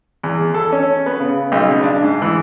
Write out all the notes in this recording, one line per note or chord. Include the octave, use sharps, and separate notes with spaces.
E2
A4
C#4
B3
C#3
B1
C#3
D4
G#2
E3